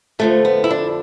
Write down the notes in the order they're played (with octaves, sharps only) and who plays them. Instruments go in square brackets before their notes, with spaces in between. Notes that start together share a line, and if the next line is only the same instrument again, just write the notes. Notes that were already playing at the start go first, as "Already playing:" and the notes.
[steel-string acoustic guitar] F2 D3 F3 A3
B3
E4
D4